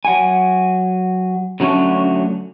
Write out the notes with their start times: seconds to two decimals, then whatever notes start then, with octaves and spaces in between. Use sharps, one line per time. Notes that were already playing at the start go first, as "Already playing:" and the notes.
0.05 F#3 F#5 G#5
1.60 D3 F#3 A3 C#4 D4